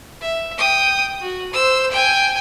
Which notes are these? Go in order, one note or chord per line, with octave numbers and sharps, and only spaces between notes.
E5
G5 D#6
F#4
C5 E6
G5 G#5